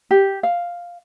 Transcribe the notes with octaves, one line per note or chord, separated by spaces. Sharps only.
G4
F5